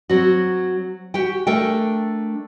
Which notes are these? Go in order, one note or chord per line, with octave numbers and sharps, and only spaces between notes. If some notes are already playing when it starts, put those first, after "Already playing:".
F#3 C4 F#4
F#4 G4 G5
A3 D4 A#4 G5